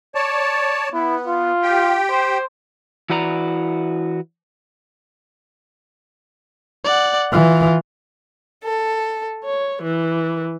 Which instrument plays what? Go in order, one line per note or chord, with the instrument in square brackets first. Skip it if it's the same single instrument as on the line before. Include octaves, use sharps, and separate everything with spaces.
[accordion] C#5 D5 A5
[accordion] B3 [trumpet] E4
[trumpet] F4
[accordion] G4 G5
[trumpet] C5
[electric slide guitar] E3 E4 F#4 B4 D5 A#5
[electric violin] D5 F#5
[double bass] E3 [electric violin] F4
[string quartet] A4
C#5
E3